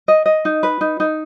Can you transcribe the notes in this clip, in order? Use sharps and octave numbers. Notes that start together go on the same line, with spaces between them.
D#5
D#5
D#4
B4
D#4
D#4